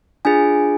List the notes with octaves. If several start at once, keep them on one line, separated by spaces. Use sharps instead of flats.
D4 F4 G#4 G#5